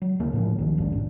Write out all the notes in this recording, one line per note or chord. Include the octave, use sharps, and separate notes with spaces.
F#3
D2 C#3 E3 A#3
A2 F3 A#3
B1 D#3 F3
F1 G#2 C3 D4
A1